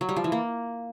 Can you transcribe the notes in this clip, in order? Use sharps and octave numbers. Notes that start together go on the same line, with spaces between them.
F#3
G3
F3
E3
A#3